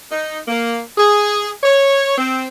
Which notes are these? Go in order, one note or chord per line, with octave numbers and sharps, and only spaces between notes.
D#4
A#3
G#4
C#5
C4